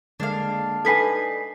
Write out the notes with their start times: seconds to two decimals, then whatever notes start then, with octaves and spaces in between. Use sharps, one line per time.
0.20 D3 G#3 A#3 D4 F5
0.85 D#4 A4 B4 D#5 G#5 G#6 B6 C7